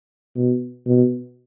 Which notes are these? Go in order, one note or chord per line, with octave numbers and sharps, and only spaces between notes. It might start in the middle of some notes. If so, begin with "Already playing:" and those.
B2
B2